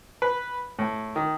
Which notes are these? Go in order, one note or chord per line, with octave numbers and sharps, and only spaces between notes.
B4
A2
D#3